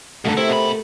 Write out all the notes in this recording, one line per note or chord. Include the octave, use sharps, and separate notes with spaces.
B2 D3 A3 F#4 A#4
C3 E4
B2 B5